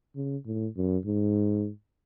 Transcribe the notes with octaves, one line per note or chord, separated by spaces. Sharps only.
C#3
A2
F#2
G#2